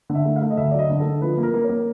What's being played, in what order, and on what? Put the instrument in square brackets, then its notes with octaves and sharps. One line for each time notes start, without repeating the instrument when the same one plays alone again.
[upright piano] D3
E5
A3
F5
A3
D#5
D2 E5
F#3 D5
D#5
D3
A4
D3
F3 B4
A#3
A#4
A#3
C#5
A#3